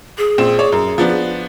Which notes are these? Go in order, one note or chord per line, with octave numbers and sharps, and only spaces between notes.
G#4
A#1 C4 E7
C#5 D5
F#2
F3 B3 D4